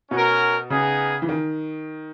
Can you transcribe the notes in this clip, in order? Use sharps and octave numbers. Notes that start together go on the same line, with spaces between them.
B2 C#4 F#4 A#4
C#3 B3 D#4 G#4
E3
D#3